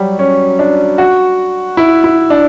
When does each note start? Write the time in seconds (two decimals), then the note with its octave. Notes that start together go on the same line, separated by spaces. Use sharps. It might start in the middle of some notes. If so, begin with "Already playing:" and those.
Already playing: F#3 G3
0.19 C#4
0.59 D4
0.98 F#4
1.77 E4
2.04 E4
2.30 D4